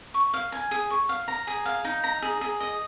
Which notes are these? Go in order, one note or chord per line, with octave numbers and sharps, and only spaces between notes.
C#6
F5
G#5
G#4
C#6
F5
A#5
G#4
F5
D#4
A#5
G#4
G#4
D#5